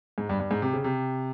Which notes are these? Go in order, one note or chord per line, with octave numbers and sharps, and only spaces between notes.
G#2
G2
G2
G#2
C3
C#3
C3